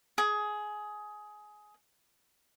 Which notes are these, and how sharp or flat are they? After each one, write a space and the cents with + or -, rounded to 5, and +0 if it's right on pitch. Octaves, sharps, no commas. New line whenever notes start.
G#4 +15